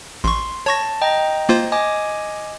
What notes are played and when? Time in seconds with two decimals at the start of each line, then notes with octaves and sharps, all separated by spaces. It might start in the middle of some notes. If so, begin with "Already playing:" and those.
0.24 A1 C6 C#6
0.66 C#5 A5 C#6 A#6
1.02 D#5 G5 A#5
1.49 A#3 F4 C5
1.72 D#5 G#5 D6